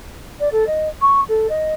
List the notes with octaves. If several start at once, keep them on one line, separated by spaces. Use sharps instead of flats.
D5
A4
D#5
C#6
A4
D#5